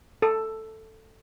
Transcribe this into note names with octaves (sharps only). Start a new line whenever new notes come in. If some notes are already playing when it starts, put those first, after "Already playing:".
A4